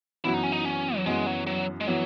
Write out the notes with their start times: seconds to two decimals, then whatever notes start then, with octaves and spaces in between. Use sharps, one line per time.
0.24 F#2 E3 B3 E4 F#4
0.34 D#4
0.43 C#4
0.52 D#4
0.65 C#4
0.96 F#3
1.06 F#2 E3 G#3 B3 F#4
1.26 F#3
1.47 F#3
1.81 G#3
1.87 E3 F#3 B3 F#4